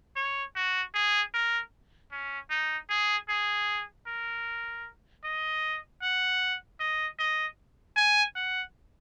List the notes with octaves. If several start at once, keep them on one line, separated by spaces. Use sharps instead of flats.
C#5
F#4
G#4
A#4
C#4
D#4
G#4
G#4
A#4
D#5
F#5
D#5
D#5
G#5
F#5